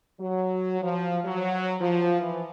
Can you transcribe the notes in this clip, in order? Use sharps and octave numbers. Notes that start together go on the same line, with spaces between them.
F#3
F3
F#3
F3
E3